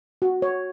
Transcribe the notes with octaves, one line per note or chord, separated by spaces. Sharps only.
F#4
C#5